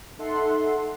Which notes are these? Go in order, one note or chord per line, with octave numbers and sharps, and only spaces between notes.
D#4 A4 E5 F#5 C6